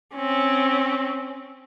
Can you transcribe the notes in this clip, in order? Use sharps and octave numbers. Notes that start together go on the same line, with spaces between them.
C4 C#4